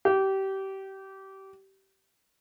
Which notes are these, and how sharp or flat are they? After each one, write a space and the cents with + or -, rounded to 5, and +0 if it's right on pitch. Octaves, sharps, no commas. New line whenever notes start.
G4 -25